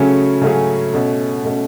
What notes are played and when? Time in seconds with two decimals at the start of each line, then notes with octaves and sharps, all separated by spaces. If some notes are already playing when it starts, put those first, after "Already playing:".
Already playing: C#3 F#3 A3 C#4 G#4
0.41 C#3 F#3 A3 C#4 G#4
0.93 B2 A3 C#4
1.44 B2 A3 C#4